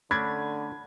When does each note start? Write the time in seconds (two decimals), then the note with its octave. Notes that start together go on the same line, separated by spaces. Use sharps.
0.11 D3 A3 C#4 D4 B5 G#6